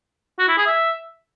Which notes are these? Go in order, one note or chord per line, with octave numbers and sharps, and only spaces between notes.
F#4
E4
G#4
E5